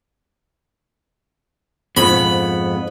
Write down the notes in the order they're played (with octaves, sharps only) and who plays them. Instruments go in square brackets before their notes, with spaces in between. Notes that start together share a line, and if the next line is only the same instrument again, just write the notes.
[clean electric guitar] F2 G#2 B3 [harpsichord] B5